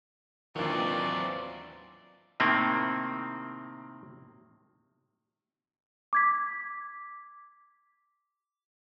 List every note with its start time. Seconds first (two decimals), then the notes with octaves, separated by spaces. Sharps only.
0.56 D#2 D#3 E3 F#3 C4 D4 F4 D5
2.40 A2 C3 D#3 A#3 C4
6.13 D6 G#6 B6